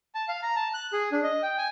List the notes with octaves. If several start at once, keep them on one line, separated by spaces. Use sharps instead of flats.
A5
F5
A#5
A5
F#6
G#4
D4
D#5
G5
G#5